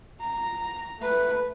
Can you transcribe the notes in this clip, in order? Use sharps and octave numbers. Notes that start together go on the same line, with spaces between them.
A#5
A3 B4